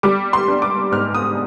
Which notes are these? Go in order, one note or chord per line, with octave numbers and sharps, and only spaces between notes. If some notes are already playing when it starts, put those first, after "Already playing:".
G3 D6
C6
D4
D6
G#2 F6
D#6